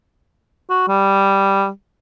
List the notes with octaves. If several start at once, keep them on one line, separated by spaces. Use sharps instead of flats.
F#4
G3